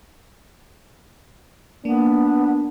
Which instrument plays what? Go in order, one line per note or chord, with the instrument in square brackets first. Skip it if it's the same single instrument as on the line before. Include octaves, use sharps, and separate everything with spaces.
[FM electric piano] A#3 [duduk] B3 [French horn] D4